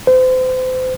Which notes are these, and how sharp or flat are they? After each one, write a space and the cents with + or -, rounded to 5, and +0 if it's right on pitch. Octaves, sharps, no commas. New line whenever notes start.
C5 -35